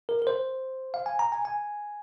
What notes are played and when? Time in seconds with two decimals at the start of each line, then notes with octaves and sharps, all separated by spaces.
0.09 A#4
0.22 A#4
0.27 C5
0.94 F5
1.06 G#5
1.19 A#5
1.32 G#5
1.45 G#5